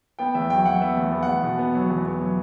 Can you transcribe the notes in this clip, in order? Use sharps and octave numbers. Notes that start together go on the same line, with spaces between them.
B3 G5
E2 E5
F#3 G5
F#3 F#5
B3 E5
E2
B3
F#5
E2
B2
B3
F#3
E2
B3
F#3